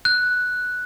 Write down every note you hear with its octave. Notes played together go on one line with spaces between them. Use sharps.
F#6